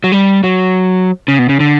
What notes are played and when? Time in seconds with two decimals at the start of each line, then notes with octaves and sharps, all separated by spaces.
0.04 F#3
0.12 G3
0.44 F#3
1.28 C#3
1.39 B2
1.49 C#3
1.60 D3